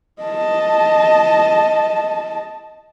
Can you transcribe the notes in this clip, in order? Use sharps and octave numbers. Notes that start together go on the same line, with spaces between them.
D#5 A5